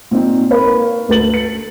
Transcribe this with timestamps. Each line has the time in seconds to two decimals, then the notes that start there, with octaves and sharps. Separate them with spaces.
0.11 A#2 C4 D#4
0.50 A#4 B4 C#5 F5 B5
1.09 D2 A3 B4 A6 F#7
1.34 C#7